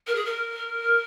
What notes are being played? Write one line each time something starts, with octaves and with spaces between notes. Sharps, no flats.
A#4
G#4
A#4